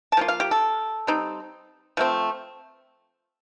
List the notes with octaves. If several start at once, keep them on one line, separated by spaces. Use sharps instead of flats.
A5
F3 A#3 F4
F5
G4
A4
G3 C4 D#4
F3 A3 C4